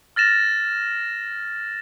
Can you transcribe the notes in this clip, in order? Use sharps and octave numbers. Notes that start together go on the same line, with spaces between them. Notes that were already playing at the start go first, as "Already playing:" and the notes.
F6 A6 A#6 E7